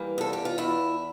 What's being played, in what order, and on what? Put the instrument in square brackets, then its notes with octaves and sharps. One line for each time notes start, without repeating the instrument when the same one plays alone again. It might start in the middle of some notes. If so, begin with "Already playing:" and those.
Already playing: [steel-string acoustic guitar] E3 G3 A#3
E2 A4
G4
F4
E2 E4